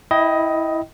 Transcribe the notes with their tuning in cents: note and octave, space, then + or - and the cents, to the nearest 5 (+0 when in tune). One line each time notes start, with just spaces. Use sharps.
E4 -10 D#5 +15 G5 -15